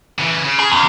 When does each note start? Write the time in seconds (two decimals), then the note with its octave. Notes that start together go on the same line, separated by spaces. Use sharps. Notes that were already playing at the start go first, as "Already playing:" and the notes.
0.19 C#3 E3
0.45 C#3
0.60 G#4
0.72 E2